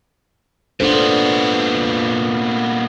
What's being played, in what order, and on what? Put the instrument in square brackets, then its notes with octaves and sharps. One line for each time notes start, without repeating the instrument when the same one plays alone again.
[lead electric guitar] A#2 B3 [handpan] D4 A4 C5